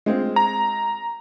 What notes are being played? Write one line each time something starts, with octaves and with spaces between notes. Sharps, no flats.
G#3 C4 F4
A#5